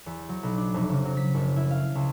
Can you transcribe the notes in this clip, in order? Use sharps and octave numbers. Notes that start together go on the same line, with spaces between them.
E2
F#3
B1
D4
F1
C#3
F#3
B6
F#1
E4
F5
C#2